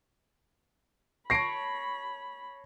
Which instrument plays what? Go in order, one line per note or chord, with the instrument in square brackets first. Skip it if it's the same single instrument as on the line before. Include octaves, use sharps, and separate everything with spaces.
[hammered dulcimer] C#5 A5 C#6 [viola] B5 [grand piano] A#6 C7 D7